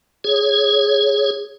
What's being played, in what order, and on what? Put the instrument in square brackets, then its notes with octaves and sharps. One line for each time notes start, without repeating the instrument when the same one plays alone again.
[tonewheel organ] G#4 C#5